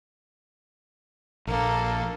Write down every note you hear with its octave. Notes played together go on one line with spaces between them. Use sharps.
A#1 A#3 A4